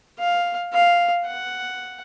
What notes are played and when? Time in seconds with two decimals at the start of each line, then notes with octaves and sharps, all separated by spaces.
0.19 F5
0.73 F5
1.26 F#5